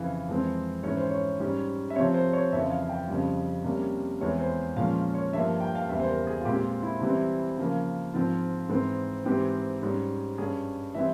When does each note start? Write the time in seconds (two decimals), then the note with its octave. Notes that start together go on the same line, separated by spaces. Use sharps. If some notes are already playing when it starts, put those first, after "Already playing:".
Already playing: F2 C#3 E3 F5
0.28 F2 E3 G#3 C4
0.83 G#2 E3 G#3 C#4 C#5
0.97 C5
1.11 C#5
1.40 G#2 G3 C#4
1.90 E5
1.96 C3 F3 C4 C#5
2.14 C5
2.33 C#5
2.52 F2 C#3 E3 E5
2.70 F5
2.89 G5
3.08 F2 C#3 G3
3.64 C3 G3 A#3 C#4
4.20 E2 E3 G#3 C4 C#5
4.40 C5
4.76 A#2 F3 G#3 C#4 F5
4.96 F5
5.15 C#5
5.32 G2 F3 A#3 E5
5.60 G5
5.75 F5
5.89 E2 C#3 G3 E5
6.00 C5
6.08 A#4
6.27 G#4
6.41 F4
6.45 A#2 G#3 C4 G4
6.65 F4
6.83 E4
7.01 C3 E3 G3 C4 E4
7.58 C#3 F3 A#3
8.14 G#2 F3 C4 F4
8.69 G#2 E3 G#3 C4
9.25 G#2 E3 G#3 C4 G4
9.83 G#2 G3 C#4
10.38 G2 G3 C#4 G#4
10.95 E3 G3 C4 E5